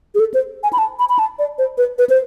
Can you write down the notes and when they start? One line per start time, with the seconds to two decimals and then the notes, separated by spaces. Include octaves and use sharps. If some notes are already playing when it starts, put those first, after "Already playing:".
0.15 G#4
0.20 A4
0.34 C5
0.63 G#5
0.73 B5
0.78 A5
0.99 B5
1.09 B5
1.19 A5
1.39 D5
1.58 C5
1.78 B4
1.98 B4
2.10 C5